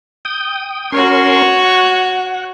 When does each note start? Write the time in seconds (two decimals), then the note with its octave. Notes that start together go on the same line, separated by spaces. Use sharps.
0.25 G5 D#6
0.92 C#4 F#4 A#4 C#5 C6
1.59 F#5